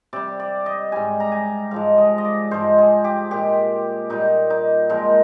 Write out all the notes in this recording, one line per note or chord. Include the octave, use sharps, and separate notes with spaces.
C3 G3 D5
D5
D#5
G#2 G3 G#5
A#5
G#5
G#2 F3 G#3 F5
D#5
D#5
D5
G#2 F3 G#3 C5
G#4
G4
A#2 G#3 G4
A#2 G3 D#4
D#4
A#2 F3 G#3 A#4